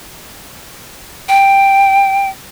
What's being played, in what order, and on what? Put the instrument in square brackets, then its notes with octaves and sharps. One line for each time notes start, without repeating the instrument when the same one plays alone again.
[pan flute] G5